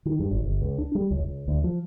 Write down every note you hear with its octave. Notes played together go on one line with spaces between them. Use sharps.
D#3
G2
G#1
G1
C#2
D4
G3
C#2
C#2
D2
F3